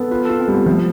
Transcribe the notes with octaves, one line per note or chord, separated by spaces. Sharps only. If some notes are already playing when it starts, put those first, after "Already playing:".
Already playing: B3 A4 B4
F4 B4
F4 A4
C4
G3
B3
F3 A3